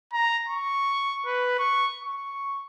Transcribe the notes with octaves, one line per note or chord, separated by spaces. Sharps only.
A#5
C#6
B4
C#6
C#6